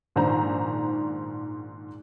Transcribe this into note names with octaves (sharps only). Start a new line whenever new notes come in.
A#1 G#2 D#3 D4 C5 A#5